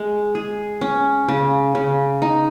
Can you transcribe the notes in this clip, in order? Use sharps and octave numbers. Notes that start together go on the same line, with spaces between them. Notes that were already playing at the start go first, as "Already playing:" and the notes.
Already playing: G#3
G#4
C#4
C#3
C#3
D#4